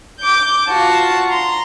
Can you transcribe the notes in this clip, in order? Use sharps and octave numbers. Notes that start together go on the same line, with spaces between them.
D6 G6
F4 F#4 A5
A#5 C6